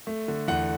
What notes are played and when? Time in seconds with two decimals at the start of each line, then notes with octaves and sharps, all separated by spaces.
0.07 A3
0.28 D3
0.48 E2 F#5